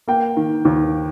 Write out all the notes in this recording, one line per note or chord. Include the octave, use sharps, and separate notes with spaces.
A#3 G5
D#3
D#2